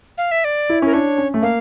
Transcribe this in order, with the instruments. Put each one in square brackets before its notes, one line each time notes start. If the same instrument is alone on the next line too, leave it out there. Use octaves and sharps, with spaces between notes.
[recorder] F5
E5
D5
[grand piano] E4
[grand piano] C#4 [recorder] A#4
[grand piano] D4 [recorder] C#5
[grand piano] C#4
A3
[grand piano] A#3 [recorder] F5